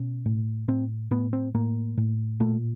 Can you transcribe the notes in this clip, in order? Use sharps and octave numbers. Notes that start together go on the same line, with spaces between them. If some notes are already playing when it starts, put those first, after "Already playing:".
Already playing: B2 C#4
A2
A2 C4
A2 B3
C4
A2 A#3
A2
A#2 A3